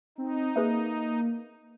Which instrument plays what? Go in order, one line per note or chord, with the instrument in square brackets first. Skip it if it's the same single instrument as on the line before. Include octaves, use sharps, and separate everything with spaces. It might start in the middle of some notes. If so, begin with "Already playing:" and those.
[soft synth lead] C4 [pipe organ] D#4
[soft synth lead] A#3 [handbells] G#4 B4 E5